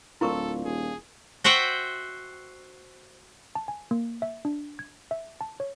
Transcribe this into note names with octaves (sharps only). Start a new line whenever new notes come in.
D1 D4 E4 F4 A4 A#4 C#6
D#1 G#4
F#4 C5 E5 F#5 G5
A5
G#5
A#3
E5
D4
G#6
E5
A5
C#5